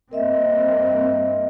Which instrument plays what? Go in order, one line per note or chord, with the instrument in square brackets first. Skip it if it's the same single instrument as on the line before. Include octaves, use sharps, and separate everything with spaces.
[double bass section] G2 A#3 C4 [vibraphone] A#4 D#5 E5